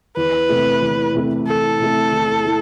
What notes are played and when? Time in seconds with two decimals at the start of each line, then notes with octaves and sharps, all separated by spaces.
0.17 E2 B4
0.49 C3 E3 A3
0.82 E2
1.15 C3 E3 A3
1.47 E2 A4
1.80 C3 E3 A3
2.12 E2
2.45 E3 A3